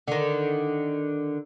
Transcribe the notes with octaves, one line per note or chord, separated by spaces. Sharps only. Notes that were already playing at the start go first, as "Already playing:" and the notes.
D3 D#3